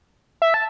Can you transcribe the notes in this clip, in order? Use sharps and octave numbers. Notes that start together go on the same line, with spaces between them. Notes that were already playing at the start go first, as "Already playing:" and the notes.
E5
A5